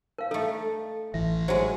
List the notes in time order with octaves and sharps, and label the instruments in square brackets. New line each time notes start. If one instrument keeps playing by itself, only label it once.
[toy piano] A#4 F5
[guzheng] A3 D#4 [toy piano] A4 D#5
[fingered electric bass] A1 E3 [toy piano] E5
[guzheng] F#3 G#3 [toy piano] F#4 C5